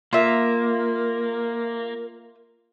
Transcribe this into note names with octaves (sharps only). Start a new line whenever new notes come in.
A#3 F4 A#4 E5